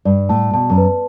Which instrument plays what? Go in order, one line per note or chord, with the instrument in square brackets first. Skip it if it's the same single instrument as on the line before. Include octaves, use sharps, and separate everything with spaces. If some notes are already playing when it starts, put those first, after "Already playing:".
[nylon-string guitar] G2 [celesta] D5
[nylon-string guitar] A2 [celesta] A5
[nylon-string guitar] B2 [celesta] A5
[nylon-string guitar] F#2
[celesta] B4